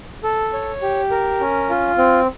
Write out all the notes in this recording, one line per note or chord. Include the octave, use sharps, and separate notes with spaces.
A4
C#5
G4
A#4
C#4
F4
C4